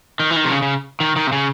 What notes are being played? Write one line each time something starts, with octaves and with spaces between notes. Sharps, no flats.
D#3
E3
D#3
C3
C#3
C#3
D#3
D#3
C3
C#3